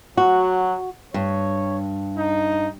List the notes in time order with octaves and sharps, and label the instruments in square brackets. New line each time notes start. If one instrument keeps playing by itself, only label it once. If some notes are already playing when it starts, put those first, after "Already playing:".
[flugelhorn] F#3 [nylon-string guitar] F#4
[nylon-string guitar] G2 [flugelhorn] C#5
[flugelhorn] D#4